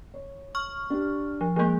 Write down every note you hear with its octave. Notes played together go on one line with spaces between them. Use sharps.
C#5
C#6 F6
D4 G4
F3
F3 G#3 A#3 G6